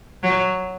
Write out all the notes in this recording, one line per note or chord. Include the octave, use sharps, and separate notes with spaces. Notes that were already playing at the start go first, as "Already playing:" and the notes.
F#3